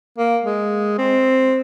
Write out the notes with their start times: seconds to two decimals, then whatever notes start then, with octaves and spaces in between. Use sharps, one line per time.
0.18 A#3
0.43 G#3
0.98 C4